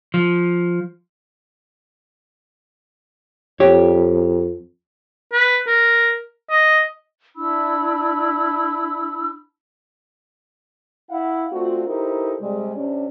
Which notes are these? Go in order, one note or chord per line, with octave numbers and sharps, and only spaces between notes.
F3
F2 G4 C#5
B4
A#4
D#5
D4 E4 B5 E6
E4 F5 F#5
A3 C4 D4 F4 F#4
D#4 E4 G4 A4 A#4 C5
C3 G3 G#3
C3 C#4 D4